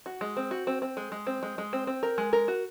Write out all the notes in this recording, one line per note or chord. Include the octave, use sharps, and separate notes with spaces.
F#4
G#3
C4
F#4
C4
C4
G#3
G#3
C4
G#3
G#3
C4
C4
A#4
G#3
A#4
F#4